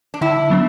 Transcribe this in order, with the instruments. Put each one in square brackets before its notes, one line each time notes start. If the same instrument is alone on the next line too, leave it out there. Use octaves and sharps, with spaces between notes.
[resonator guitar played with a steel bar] D4
[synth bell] D3 [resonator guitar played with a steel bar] E4
[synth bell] F#3 B3 D4